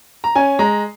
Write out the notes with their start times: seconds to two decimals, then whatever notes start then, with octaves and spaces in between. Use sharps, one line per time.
0.24 A#5
0.35 C#4 G#5
0.59 G#3 A#5